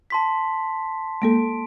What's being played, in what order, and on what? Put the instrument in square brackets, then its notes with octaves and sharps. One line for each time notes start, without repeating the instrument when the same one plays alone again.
[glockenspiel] A5 C6 B6
[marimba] G#3 A#3 A4 [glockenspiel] D7